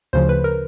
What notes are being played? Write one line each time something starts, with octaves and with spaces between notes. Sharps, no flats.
D2 C#3 F3 C5
B4
A#4